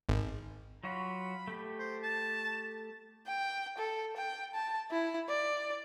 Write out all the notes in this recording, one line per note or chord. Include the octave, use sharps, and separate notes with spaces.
G#1
F#3 F4 F#4 B5
A3 G4
C5
A5
G5
A4
G5
A5
E4
D5